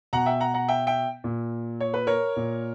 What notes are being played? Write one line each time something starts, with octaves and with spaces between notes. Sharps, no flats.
B2 F#5 A#5
E5 G5
F#5 A#5
F#5 A#5
E5 G5
E5 G5
A#2
C#5
B4
A#4 C#5
A#2